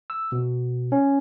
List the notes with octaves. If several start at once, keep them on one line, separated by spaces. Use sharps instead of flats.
E6
B2
C#4